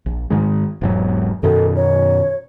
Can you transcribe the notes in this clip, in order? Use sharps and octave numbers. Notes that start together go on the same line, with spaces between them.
A#1
G#2 D#3 G#3
E1 G#2 F#3
F#2 B2 D#3 A4
C#5